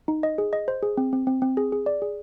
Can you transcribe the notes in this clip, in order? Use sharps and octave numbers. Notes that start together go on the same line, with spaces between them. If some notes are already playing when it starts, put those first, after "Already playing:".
D#4
D#5
G#4
D#5
C5
G#4
C4
C4
C4
C4
G#4
G#4
D5
G#4